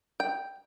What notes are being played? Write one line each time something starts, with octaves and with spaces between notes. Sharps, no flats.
G5